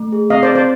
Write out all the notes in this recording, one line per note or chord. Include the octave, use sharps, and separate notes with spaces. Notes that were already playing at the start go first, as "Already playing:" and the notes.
Already playing: A3
G#4
C4 D#5 F5
C5 D5
C4
C5 D5